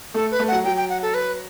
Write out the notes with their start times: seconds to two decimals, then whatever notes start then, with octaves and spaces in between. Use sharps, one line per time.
0.14 A3 A4
0.31 B4
0.39 A3
0.48 F#3 F#5
0.64 F#3 G5
0.77 G5
0.89 F#5
1.02 A4
1.14 B4